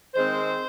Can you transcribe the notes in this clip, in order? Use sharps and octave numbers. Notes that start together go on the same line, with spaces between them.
D#3 G#3 C4 C5